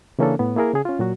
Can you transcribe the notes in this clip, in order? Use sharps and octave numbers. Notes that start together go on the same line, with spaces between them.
C#3 E3 A#3 C#4 D4 A4
A2 B3
A#3 E4 G#4 A#4
C#3 G#4
C#4 F4
A#2 F#3 F#4